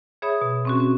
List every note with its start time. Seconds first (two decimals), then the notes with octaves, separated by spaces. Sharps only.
0.22 G#4 C#5 E5 B5 D#6
0.41 B2
0.65 C4 C#4 F#4
0.80 C#4